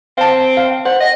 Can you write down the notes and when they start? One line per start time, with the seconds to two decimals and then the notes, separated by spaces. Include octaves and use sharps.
0.18 C4 F5 A5
0.57 F5
0.85 C5 F#5
1.00 D#5